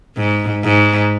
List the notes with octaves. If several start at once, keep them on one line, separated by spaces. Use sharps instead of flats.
G#2
G#2